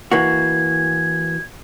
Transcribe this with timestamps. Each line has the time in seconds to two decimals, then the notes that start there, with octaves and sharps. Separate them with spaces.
0.12 E3 A#3 F#4 G#6